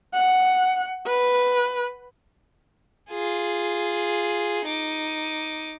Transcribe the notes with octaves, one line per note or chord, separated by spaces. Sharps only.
F#5
B4
F4 G#4
D#4 D6